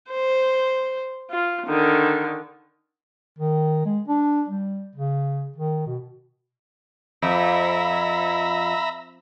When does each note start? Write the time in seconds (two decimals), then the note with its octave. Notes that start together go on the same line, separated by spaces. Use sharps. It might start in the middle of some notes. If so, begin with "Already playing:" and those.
0.10 C5
1.31 F4
1.67 D3 D#3
3.39 D#3
3.86 G#3
4.08 D4
4.48 G3
4.95 C#3
5.56 D#3
5.87 B2
7.22 F2 E5 A#5 B5